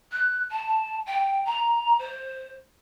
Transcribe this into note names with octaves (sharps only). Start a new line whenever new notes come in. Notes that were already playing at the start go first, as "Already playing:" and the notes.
F#6
A5
G5
A#5
C5